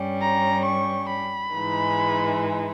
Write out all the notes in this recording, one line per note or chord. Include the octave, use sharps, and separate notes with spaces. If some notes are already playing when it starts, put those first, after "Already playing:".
Already playing: G2 G3 C#4
A#5
C#6
B5
G#2 E3 G#3 D#4